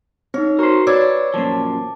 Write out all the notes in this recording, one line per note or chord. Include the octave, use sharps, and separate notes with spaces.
C4 D#4 C#5
F#4 A#4 C5 C#6
B4 C#5 D5 E6 G#6
F#2 A#2 F3 A5 D6